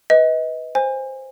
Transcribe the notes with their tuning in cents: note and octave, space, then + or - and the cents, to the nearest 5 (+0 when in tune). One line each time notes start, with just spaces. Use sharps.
B4 +0 D#5 +30
C5 +5 G#5 -25